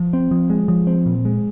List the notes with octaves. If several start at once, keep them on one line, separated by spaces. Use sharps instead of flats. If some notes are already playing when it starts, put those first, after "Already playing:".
Already playing: F3
C4
F3
G#3
F3
C4
A#2
G#3